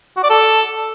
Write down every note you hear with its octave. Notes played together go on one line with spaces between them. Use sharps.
F#4
D5
A4